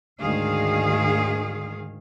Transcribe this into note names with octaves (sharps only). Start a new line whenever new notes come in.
D2 G#2 D#3 G#4 F5